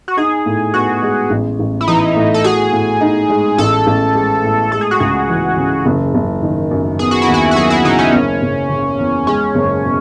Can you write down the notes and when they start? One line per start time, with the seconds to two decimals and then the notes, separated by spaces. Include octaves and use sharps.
0.08 F#4
0.17 D#4 G#4
0.46 A2
0.74 B3 F#4
1.02 G#3
1.30 A1
1.59 A1
1.81 E4
1.88 E3 D#4
2.16 A2
2.34 A4
2.44 F#4 G#4
2.72 A2
3.01 D#4
3.29 G#3
3.58 A1 A4
3.87 A1
4.15 G#3
4.44 A2
4.72 G#3 A4
4.81 G#4
4.91 F#4
5.00 C#2 G#4
5.29 E3
5.57 C#3
5.86 F#1
6.14 F#1
6.43 D#3
6.71 F#2
6.99 B3 G#4
7.11 F#4
7.22 E4
7.28 D#2
7.34 F#4
7.51 F#4
7.56 F#3 G#4
7.70 E4
7.85 C#3 D#4
7.99 C#4
8.13 F#1
8.42 F#1
8.70 C#3
8.98 E2
9.27 G#3 C#4
9.55 F#1
9.84 B2